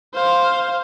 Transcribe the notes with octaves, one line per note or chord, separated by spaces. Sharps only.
C5 F5